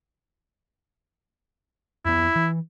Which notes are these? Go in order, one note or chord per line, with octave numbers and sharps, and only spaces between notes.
F2 B3 E4
E3